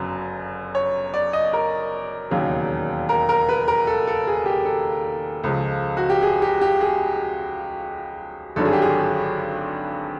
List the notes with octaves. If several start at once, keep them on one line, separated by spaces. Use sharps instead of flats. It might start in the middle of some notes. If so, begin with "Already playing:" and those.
Already playing: G1 F#2 C#3 F#3
C#5
D5
D#5
A#4
E1 D#2 C#3 F#3
A#4
A#4
B4
A#4
A4
A4
G#4
G4
A4
C#2 C#3 F3 G#3
F#4
G4
G#4
G4
G4
G#4
G#1 G2 D3 F#3 A4
G#4
G4
G#4